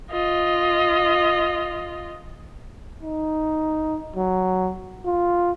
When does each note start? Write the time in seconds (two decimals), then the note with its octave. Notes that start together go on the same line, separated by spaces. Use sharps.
0.11 F4 D#5
3.03 D#4
4.16 F#3
5.06 F4